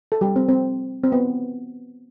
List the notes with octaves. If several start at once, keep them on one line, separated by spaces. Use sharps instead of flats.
A4
G3 G4
C4
C4
C4
B3